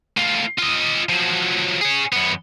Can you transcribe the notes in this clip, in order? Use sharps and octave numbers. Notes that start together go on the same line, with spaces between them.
A2 F4
F4 D#5
F3 F#3
G#4 C#5
F#2 B3